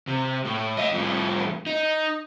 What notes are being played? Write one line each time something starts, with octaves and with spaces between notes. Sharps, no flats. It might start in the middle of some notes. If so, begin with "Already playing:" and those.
C3
A2
D#5 F5
F2 A2
D#4